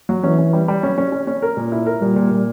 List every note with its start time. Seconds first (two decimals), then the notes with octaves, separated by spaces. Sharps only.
0.09 F#3
0.24 E3 C#4
0.38 C#4
0.53 G3
0.68 G3
0.83 F#3 C#4
0.98 C#4
1.12 C#4
1.27 C#4
1.42 A#4
1.57 A#2
1.72 E4
1.86 A#4
2.01 A#2 G3
2.16 A#2
2.31 A#2